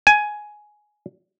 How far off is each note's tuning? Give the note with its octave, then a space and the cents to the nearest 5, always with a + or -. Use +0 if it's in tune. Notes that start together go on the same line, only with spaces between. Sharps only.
G#5 +10